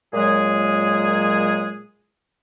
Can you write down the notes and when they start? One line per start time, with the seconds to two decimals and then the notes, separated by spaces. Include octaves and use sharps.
0.14 A#2 F#3 G#3 G#4